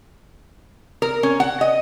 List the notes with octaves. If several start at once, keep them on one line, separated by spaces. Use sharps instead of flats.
A#4
C#4
F#5
D#5